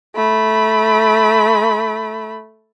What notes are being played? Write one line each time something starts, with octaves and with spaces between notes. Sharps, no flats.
A3 B5